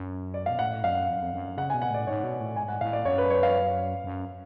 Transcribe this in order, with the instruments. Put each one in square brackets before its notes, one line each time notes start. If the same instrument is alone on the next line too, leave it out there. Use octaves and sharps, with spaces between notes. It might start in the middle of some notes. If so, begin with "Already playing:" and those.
Already playing: [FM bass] F#2
[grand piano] D5
[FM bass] B2 [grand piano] F5
[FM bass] A2 [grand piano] F#5
[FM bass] F#2 [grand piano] F5
[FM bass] F2
F#2
F2
F#2
[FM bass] C#3 [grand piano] F#5
[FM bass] B2 [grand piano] G#5
[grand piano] F#5
[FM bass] A2 [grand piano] D5
[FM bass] G#2 [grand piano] C#5
[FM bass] B2
A2
[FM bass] G#2 [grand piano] G#5
[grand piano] F#5
[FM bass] A2 [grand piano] F5
[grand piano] D5
[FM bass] F#2 [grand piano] C#5
[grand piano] B4
C#5
F5
[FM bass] F#2